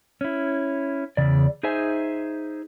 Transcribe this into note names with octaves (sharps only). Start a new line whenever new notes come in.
C#4 E4
E2 C#3 D5
D#4 G#4 C5 E5 G#5